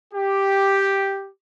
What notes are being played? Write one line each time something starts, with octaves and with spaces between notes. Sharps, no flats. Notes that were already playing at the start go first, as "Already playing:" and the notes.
G4